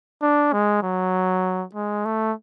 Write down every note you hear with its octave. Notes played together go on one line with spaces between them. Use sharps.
D4
G#3
F#3
G#3
A3